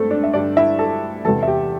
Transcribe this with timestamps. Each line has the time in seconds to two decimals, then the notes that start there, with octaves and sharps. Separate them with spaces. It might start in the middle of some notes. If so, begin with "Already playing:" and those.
Already playing: G2 A3 C4 A4
0.11 D4 D5
0.24 E5
0.33 G2 D3 G3 D4 D5
0.57 E4 E5
0.79 A4 A5
1.25 E2 C3 E3 A4 A5
1.43 E5
1.47 G4 G5